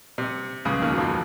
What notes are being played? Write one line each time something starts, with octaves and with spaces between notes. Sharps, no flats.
C3
C#2 C#3
D#2 D#3
F#3
F2 F3